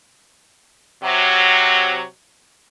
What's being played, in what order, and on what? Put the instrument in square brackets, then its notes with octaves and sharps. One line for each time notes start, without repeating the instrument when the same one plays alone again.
[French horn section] C3 F#3